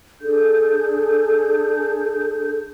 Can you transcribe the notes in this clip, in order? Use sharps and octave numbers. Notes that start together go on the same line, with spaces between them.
D4 G#4 A4 G6